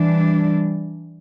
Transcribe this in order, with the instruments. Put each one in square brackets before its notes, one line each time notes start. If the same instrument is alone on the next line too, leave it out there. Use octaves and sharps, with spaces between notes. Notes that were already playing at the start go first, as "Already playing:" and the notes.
Already playing: [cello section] E3 G3 D4